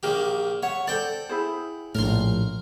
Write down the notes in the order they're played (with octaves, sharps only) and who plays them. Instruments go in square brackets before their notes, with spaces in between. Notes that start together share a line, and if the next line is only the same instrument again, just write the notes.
[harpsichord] A#1 A#3 G4
[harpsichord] C#5 [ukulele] E5 F#5
[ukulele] A4 C5 D5 [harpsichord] F#5 G5
[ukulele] E4 G#4 C5
[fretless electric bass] A#1 A2 [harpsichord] A#4 A#5 C6